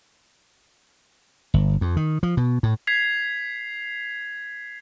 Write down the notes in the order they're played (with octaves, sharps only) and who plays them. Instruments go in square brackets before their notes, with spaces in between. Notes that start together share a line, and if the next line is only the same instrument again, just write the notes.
[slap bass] G1
F2
D#3
F3
B2
A2
[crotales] G#6 B6 C7 F7